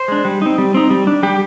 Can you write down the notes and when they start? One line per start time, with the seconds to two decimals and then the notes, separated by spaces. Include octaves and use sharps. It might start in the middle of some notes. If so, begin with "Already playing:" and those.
Already playing: C5
0.08 G#3 D4
0.25 G3
0.42 C4 D#4
0.58 G3
0.74 C4 D#4
0.90 G3
1.07 D4
1.23 G3 G4